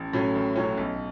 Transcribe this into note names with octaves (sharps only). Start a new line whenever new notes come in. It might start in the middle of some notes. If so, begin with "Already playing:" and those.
Already playing: A1
A2 F#3 C#4
A1
A2 F#3 C#4
B1